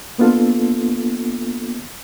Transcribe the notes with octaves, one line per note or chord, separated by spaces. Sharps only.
A#3 B3 D4 F4 A4